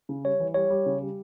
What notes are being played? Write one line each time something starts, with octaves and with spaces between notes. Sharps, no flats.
C#3
G3 C#5
E3
G3 C#5
G3
C#3
G3